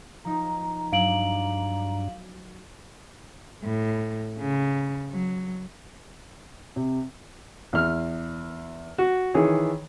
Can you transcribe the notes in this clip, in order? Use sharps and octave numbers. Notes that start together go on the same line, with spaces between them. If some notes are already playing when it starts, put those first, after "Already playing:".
F3 D#4 A#5
G2 F#3 D4 F5 D7 F#7
A2
C#3
F#3
C3
E2 F6
F#4
D#3 E3 G#4 C#5